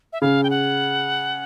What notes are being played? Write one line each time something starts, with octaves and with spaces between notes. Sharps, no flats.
E5
C#3 F5
G5
F#5